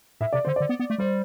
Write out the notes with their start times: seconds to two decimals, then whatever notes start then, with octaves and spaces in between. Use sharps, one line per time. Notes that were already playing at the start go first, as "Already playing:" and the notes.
0.21 A2 E5
0.33 C3 D5
0.45 D3 C5
0.56 D3 D5
0.69 B3
0.80 B3
0.90 A3
0.98 G3 C5